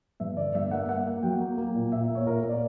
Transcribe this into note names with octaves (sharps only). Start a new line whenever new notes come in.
G2 E5
D3 D5
G2 E5
A#3 F#5
A#3 F#5
A#3
F#3 G5
A#3
A#3
A#2
A#2 E5
A#3
C#5
A#2 A#4
A#3
D5